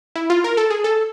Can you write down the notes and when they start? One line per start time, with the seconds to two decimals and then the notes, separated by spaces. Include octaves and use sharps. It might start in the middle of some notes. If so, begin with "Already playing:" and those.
0.15 E4
0.30 F4
0.44 A#4
0.57 A4
0.70 G#4
0.84 A4